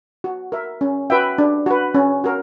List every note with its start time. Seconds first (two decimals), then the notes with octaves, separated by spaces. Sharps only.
0.24 F#4
0.52 A#4 E5
0.81 C#4
1.10 F#4 B4 E5 G5
1.38 D4
1.66 F#4 B4
1.94 C#4
2.24 F#4 A#4